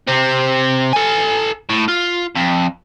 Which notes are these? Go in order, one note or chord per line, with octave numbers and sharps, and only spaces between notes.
C3 C4
A4 G#5
A2
F4
F2